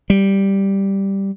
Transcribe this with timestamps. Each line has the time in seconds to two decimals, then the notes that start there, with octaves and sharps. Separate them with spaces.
0.10 G3